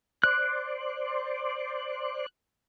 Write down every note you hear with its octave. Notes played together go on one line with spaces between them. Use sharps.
C5 D5 F#6